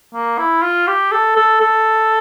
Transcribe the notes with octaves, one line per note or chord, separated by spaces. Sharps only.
A#3
E4
F4
G4
A4
A4
A4